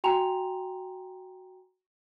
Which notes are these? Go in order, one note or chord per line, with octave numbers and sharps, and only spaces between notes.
F#4 G5 G#5 A#5 C6 F7